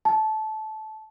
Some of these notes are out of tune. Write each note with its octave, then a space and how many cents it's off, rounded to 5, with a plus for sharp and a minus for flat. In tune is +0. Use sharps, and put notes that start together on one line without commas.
A5 -20